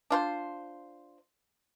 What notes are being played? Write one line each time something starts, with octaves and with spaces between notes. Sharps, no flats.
D4 F4 C5